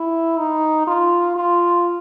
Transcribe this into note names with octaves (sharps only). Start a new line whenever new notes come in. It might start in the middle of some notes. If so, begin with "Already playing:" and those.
Already playing: E4
D#4
F4
F4